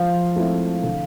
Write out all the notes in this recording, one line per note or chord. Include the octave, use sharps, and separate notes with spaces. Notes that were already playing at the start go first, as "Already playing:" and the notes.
Already playing: F3 F5
A3 C4 E4
D3